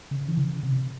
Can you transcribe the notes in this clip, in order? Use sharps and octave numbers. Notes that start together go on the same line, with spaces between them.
C#3
E3
C#3
C3